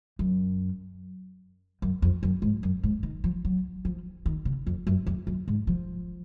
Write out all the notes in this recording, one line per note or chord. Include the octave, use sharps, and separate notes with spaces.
F#2
F#2
F2
F#2
G#2
F#2
G#2
D#3
F3
F#3
F3
D#3
C#3
F2
F#2
F2
F#2
G#2
F3